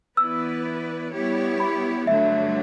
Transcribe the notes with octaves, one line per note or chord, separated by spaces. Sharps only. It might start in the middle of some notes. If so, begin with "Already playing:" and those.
E3 B3 E4 B4 D5 E6
G3 B3 E4 G4 C#5
B5
G2 D3 F#3 A3 E5